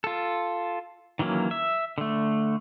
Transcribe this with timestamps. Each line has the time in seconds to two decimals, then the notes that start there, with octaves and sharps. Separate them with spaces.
0.04 F4 A4
1.19 D#3 E3 F#3 A#3 C#4
1.51 E5
1.98 D3 A3